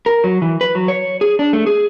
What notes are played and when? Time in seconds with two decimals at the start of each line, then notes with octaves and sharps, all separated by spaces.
0.06 A#4
0.24 F#3
0.42 E3
0.61 B4
0.75 F#3
0.88 C#5
1.21 G#4
1.39 D4
1.53 A3
1.67 G#4